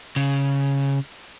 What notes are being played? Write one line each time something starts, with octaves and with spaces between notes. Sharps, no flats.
C#3